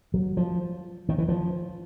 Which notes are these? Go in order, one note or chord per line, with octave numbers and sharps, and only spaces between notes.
F#3
F3
D#3
E3
F3